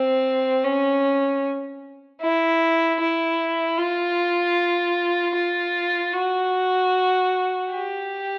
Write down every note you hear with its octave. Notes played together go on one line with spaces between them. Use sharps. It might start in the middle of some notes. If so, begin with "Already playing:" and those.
Already playing: C4
C#4
E4
E4
F4
F4
F#4
G4